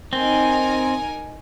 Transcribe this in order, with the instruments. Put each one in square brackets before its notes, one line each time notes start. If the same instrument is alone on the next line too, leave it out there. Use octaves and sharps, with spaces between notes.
[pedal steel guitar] C4 [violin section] D#4 A#4 D#5 G#5